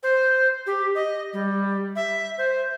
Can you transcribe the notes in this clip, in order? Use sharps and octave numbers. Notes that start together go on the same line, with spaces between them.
C5
G4
D#5
G3
E5
C5